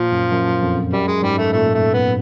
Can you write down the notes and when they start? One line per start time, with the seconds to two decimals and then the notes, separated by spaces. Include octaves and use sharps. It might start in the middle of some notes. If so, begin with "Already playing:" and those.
Already playing: A#2 F3
0.12 F#2
0.32 F#2
0.62 F2
0.93 F#2 G3
1.07 G#3
1.23 G#2 G3
1.38 A3
1.53 A#2 A3
1.74 A3
1.94 B3